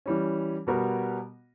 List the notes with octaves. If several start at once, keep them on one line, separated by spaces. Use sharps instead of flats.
E3 G3 C#4
B2 G3 B3 F#4 A#4